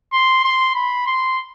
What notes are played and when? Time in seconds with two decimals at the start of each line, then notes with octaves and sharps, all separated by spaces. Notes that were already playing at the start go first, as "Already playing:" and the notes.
0.12 C6
0.44 C6
0.75 B5
1.06 C6